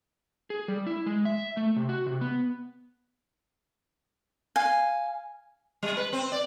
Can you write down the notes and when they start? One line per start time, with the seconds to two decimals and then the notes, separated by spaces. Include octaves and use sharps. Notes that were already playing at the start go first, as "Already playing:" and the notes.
0.50 G#4
0.68 G3
0.87 E4
1.06 G#3
1.25 E5
1.57 A3
1.76 C3
1.89 F#4
2.07 C3
2.21 B3
4.56 F5 G#5
5.83 G3
5.97 B4
6.13 C4
6.32 D5